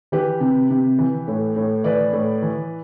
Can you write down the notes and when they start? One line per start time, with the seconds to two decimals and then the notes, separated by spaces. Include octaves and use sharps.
0.12 E3 G4 B4
0.41 C3
0.70 C3
0.99 E3
1.28 A2
1.56 A2
1.84 E3 B4 D5
2.13 A2
2.42 E3